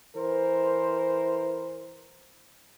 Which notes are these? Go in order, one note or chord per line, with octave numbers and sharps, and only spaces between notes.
E3 A#4 C5